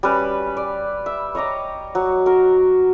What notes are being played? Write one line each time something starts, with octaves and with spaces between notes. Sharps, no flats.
G3 C#4 B4
D5
E5
C#5 D#5 A#5 D6
F#3
F#4 A#4